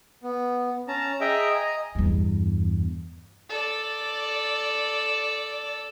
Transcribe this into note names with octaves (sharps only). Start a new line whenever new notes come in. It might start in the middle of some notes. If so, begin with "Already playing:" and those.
B3
C#4 A5 A#5
G#4 D#5 E5 G5 A#5
D#5 G#5 A#5
E2 G2
A4 D5